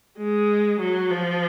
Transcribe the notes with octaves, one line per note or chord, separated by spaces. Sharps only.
G#3
F#3
F3